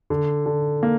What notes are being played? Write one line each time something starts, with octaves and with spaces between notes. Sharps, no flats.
D3
D3
A#3